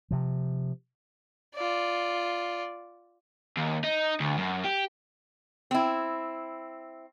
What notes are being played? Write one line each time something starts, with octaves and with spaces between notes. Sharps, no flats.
C3 F3
F4 D5
D#2
D#4
D2
F#2
G4
C4 E4